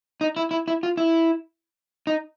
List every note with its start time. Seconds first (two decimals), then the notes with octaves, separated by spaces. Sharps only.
0.21 D#4
0.36 E4
0.51 E4
0.68 E4
0.83 F4
0.97 E4
2.07 D#4